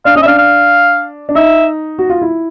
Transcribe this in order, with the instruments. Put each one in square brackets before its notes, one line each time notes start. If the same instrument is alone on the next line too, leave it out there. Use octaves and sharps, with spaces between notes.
[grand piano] D4 [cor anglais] F5
[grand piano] C#4 [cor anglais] D#5
[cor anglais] E5
[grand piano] D4 [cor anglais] F5
[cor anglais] F5
[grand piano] D4
[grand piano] D#4 [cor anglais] E5
[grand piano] F#4
F4
E4